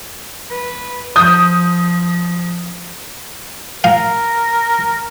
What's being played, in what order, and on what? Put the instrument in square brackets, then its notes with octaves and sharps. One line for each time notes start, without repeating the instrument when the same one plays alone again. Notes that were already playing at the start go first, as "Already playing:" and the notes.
[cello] B4
[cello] F3 [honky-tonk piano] D#6 G6
[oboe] A#4 [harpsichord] F5